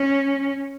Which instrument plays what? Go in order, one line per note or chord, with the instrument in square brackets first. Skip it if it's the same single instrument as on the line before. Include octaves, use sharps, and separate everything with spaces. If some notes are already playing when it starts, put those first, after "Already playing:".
Already playing: [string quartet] C#4